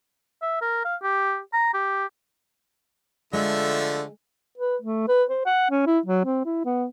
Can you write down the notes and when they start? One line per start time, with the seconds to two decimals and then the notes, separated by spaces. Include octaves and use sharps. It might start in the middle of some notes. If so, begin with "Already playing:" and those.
0.42 E5
0.62 A#4
0.85 F5
1.03 G4
1.53 A#5
1.74 G4
3.33 D3 F3 G#3 A3 E5
4.58 B4
4.82 A3
5.08 B4
5.29 C5
5.45 F#5
5.70 C#4
5.86 E4
6.05 F#3
6.25 C4
6.45 E4
6.65 B3